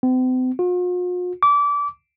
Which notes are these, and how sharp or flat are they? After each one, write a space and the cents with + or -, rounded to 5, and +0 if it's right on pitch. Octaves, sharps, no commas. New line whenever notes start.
C4 -45
F4 +45
D6 -25